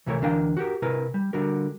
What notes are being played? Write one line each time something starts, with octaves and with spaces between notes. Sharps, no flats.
C2 C3 E3 A3 A#4 C#5
D2 E3 D4 A#4 F5 G5
F#4 G4 A#4
C3 E4 A#4 B4
G3
D3 G3 F#4 A#4